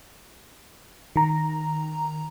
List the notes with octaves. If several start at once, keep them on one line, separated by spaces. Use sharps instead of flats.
D#3 A#5